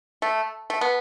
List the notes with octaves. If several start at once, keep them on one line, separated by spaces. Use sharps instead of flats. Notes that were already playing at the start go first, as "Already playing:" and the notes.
A3
A3
B3